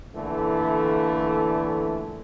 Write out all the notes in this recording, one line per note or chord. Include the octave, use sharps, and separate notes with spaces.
A#2 D3 E3 A3